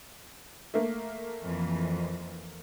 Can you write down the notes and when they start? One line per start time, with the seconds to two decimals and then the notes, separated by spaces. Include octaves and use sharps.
0.74 A3 A#3
1.43 F2 E3